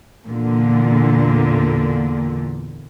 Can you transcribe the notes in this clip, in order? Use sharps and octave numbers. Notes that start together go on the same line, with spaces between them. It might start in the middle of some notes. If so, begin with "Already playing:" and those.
E2 A#2 D3